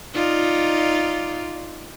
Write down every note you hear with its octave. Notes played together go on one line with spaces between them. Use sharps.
D#4 F4 D5